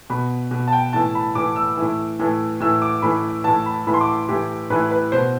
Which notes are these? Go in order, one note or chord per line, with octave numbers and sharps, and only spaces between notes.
B2 B5
B2
A5
G5
A2 E3 A5
B5
A2 E3 D6
E6
A2 E3
A2 E3
A2 E3 E6
D6
A2 E3 B5
A2 E3 A5
B5
A2 E3 B5
C6
D6
A2 E3 G4
A2 E3 B4
B4
B2 C5